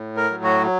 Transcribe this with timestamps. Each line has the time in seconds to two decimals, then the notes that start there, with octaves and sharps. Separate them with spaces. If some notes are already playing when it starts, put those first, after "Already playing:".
Already playing: A2
0.17 A#4
0.30 F#3
0.44 F#4